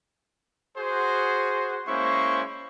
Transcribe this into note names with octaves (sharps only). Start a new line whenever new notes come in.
F#4 G#4 C5
G#3 A#3 C#4 E4 C5 C#6